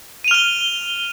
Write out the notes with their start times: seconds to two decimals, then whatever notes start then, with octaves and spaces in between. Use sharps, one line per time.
0.24 D#7
0.28 F7
0.31 F6
0.34 G7